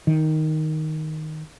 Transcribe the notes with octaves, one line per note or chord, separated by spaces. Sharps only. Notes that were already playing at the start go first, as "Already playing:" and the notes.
D#3